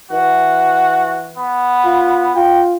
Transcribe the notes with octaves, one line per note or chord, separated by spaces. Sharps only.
E3 F#4
B3
F4
F4 G5